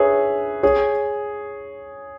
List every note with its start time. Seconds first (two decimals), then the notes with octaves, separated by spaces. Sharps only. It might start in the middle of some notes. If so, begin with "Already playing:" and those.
Already playing: G#4 B4 C#5 E5
0.63 G#4 C#5